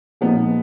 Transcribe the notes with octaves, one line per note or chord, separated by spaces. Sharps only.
A#2 F3 G#3 B3 D#4